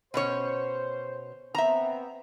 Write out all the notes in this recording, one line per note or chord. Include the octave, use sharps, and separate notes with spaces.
B2 C#4 C5 C#5
B3 C4 E5 A#5